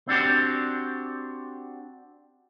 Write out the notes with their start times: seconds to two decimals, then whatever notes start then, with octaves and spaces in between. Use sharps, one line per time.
0.08 C4 D4 F#4 G4